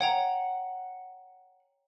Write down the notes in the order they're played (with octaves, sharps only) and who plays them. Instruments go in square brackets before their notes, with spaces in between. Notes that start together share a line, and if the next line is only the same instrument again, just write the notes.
[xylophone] C#5 G5 A#5 [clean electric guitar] F#5